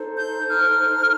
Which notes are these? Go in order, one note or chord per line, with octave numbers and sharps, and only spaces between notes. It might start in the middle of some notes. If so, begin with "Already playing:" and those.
Already playing: D#4 A4 C5
G6
F6